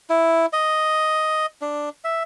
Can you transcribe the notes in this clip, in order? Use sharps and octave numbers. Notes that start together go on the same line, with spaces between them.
E4
D#5
D4
E5